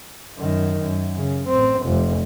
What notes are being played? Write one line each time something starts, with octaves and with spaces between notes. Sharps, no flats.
F#2 D#3
F#2
C#3
A1 C4
F1 F2